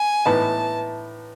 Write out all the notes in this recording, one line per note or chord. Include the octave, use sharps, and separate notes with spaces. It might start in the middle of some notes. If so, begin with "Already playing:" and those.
Already playing: G#5
A2 E3 B3 D#4 A5